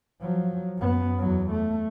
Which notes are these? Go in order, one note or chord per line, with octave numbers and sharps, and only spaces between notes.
F3 F#3
F#2 B3
E2 F#3
A3